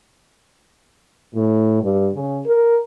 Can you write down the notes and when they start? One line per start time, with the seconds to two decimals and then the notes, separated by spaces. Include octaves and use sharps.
1.34 A2
1.83 G2
2.13 C#3
2.46 A#4